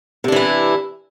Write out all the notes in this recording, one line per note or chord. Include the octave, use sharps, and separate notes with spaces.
C3 E3 D4 E4